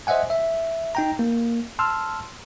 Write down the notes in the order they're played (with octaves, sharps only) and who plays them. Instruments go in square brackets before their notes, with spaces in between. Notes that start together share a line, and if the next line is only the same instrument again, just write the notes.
[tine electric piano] C5 D#5 E5 F#5 G#5
E5
D#4 G5 A#5
A#3
A5 C6 E6 F6